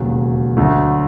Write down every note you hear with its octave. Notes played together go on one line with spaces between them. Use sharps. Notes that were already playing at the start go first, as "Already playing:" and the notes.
Already playing: E1 D#2 C#3 F#3
D2 D3 F#3 A3